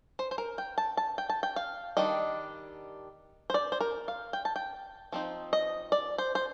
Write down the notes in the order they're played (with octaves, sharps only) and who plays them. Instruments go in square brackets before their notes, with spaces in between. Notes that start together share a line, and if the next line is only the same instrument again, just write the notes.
[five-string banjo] C5
C5
A#4
G5
A5
A5
G5
A5
G5
F5
D#3 G3 D4 D#5
C5
D5
C5
A#4
F5
G5
A5
G5
F3 C4 D#4
D#5
D5
C5
C5